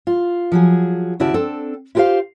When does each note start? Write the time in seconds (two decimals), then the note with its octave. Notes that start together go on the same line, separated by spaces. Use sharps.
0.07 F4
0.52 F3 F#3 G#4
1.20 D#2 C#3 E4 F#4 D5 A5
1.34 C4 D4 A4
1.95 E4 F4 G4 A4 C5 F5